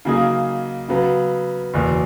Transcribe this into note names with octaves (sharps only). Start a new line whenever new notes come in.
C#3 F#3 A#3 D#4 G#4
C#3 F#3 B3
F#1 E2 B2